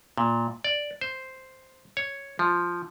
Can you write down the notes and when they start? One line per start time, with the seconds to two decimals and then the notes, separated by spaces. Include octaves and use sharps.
0.18 A#2
0.64 D5
1.01 C5
1.97 C#5
2.39 F3